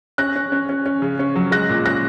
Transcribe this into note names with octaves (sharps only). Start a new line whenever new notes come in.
C#4 F#6 A#6
C#4
C#4
C#4
C#4
C#3
C#4
F#3
G#3 F#6 A#6
A#2
C#4 F#6 A#6